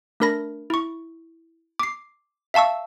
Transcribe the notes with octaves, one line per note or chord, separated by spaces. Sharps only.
A3 D4 A#4 B5 A#6
E4 C#6
D6 C7
E5 F5 A5 C#6 E6